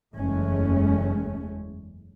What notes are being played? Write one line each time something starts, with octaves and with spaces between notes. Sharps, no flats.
F#1 E2 G#3 A3 C#4